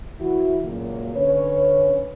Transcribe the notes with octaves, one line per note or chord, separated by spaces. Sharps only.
E3 E4 F#4
C#2 F#2 A#2 A#3
D3 C#4 B4 C#5